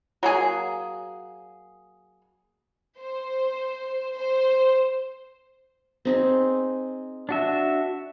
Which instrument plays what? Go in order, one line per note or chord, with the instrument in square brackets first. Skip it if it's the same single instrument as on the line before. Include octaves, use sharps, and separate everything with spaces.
[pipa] F#3 A#3 G#4 G#5
[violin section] C5
C5
[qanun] C4 D#4 G#4
[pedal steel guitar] D4 F#4 E5